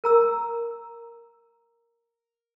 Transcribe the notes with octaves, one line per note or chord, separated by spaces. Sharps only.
A#4 A#5 E6